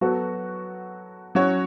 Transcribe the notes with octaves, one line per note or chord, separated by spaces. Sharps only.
F#3 B3 F#4 A4
F#3 C#4 F#4 C#5